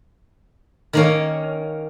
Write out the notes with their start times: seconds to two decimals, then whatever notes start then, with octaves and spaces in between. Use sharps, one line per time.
0.93 D#3 A#3 C#4